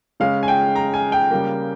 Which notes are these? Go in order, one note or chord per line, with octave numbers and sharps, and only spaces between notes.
C#3 G#3 C#4 F5
G#5
G5
A#5
G#5
G5
C#3 G3 A#3